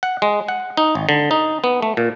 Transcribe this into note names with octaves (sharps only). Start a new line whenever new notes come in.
F#5
G#3
F#5
D#4
G#1
D3
D#4
B3
A3
A#2